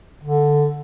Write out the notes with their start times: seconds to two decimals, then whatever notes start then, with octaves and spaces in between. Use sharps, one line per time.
0.23 D3